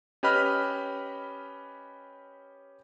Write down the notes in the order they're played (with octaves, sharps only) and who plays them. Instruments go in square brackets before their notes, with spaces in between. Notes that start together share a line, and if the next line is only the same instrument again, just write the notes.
[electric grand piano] C#4 G4 B4 D#5 B5 F6